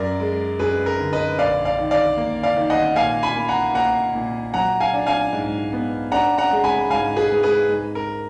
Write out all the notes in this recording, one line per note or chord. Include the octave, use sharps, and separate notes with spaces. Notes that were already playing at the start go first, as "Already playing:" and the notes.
Already playing: F#2 A#4 D5
G#3
F#2 G#4 B4
A#4
D3
B4 D#5
A#1 D5 F5
D5 F5
D#3
D5 F5
A#3
D5 F5
D#3
D#5 F#5
A#2 F5 G#5
G#5 B5
A#3
F#5 A#5
A#3 F#5 A#5
A#2
F#3 F#5 A#5
F5 G#5
D4
F5 G#5
G#2
B3
D4 F#5 A#5
F#5 A#5
G#3
G#5 B5
G#2 F5 G#5
G#4 B4
G#3
G#4 B4
G#2
A#4